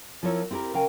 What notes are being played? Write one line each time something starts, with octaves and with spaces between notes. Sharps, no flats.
F3 C4 E4 A#4 C#5
C4 E4 G4 A4 A#4
C#3 A#4 F5 G5 G#5